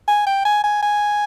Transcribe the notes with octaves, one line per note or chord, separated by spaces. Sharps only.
G#5
G5
G#5
G#5
G#5